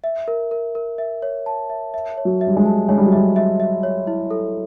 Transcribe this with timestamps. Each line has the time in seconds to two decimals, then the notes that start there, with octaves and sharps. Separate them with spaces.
0.04 E5
0.28 A#4
0.51 A#4
0.75 A#4
0.98 E5
1.22 C#5
1.46 A5
1.70 E5
1.94 E5
2.17 C#5
2.25 F#3
2.41 E5
2.47 G3
2.56 G#3
2.65 A5
2.89 G#3 C#5
2.97 G3
3.06 F#3
3.12 G3 E5
3.36 E5
3.60 E5
3.83 C#5
4.07 E4
4.31 A4